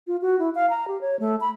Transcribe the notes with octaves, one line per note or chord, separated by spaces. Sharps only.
F4
F#4
E4
F5
A#5
G4
C#5
A3
B5